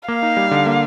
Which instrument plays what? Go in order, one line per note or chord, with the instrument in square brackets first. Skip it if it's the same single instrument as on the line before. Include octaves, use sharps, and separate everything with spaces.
[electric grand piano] A#3 [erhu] F5
[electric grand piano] D#4
G3
D3
A#3